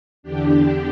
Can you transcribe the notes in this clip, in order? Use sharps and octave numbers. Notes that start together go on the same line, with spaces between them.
E2 D3 D4 G4